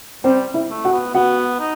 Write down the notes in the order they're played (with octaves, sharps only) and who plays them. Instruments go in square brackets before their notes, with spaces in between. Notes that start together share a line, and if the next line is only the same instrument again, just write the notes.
[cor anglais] G3 [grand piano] C4 C5
[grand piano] E4 E5
[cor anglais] A3
[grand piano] F#4 F#5
[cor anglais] B3
[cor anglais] B3 [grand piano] F#4 F#5
[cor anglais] D#4